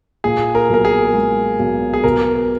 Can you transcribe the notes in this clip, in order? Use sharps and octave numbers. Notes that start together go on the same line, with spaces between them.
A#2 G#4
A#4
B1 A#4
G#4
G#3
B1
G#4
B2 A#4